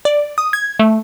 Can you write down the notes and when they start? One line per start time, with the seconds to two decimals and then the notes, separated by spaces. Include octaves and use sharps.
0.05 D5
0.38 D#6
0.53 G#6
0.79 A3